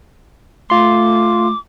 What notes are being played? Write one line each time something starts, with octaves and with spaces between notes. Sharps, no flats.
A3 F4 C6 D6